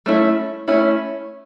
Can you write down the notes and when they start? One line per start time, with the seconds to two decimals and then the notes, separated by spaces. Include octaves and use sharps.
0.06 A3 C#4 E4
0.68 A3 C#4 E4